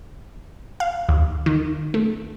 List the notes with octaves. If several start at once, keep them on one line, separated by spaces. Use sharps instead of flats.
F5
D#2
D#3
A3